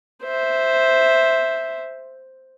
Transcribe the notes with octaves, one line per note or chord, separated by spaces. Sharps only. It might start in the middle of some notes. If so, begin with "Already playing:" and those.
C5 E5